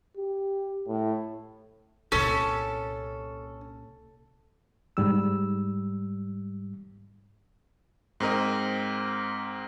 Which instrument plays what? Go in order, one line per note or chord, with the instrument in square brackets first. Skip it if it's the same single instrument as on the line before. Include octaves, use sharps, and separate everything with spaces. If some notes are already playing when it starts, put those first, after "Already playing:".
[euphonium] G4
A2
[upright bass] C2 A#2 [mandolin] C#4 [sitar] A4
[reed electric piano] G#2 G3 E6
[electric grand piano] G#2 C4 A#4 D#5